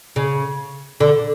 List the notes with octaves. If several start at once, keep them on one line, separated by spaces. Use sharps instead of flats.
C#3
D3